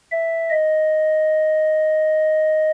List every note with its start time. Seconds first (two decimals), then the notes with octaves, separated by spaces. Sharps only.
0.12 E5
0.50 D#5